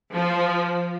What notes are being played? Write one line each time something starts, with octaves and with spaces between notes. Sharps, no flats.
F3